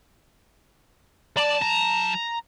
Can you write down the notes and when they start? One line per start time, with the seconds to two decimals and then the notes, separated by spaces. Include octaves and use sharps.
1.37 F#3 D5 A5
1.62 A#5